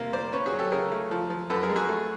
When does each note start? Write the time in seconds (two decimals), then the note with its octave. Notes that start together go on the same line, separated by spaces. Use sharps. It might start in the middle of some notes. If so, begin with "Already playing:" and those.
Already playing: C3 A#3
0.13 A#3 C5 D5
0.32 C#4 B4 C#5
0.46 F#4 G#4
0.53 F#3
0.59 G4 A4
0.72 C#3 G#4 A#4
0.92 A3
1.11 F3
1.30 F3
1.50 F#2 A4 B4
1.63 G#4 A#4
1.69 G#3
1.76 F#4 G#4
1.89 A3